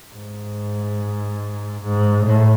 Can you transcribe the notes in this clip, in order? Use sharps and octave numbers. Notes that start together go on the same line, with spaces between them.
G#2
G#2
A2